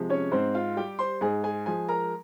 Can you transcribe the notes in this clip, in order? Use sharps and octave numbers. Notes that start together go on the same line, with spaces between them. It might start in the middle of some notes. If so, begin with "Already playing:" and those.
Already playing: C3 F3 G#3
C#4 C#5
G#2 C4 C5
F4 F5
G3 G4 G5
C5 C6
G#2 G#4 G#5
G#4 G#5
F3 G#3 G#4 G#5
A#4 A#5